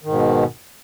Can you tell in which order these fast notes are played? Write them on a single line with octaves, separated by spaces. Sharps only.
D#3 G#2 B2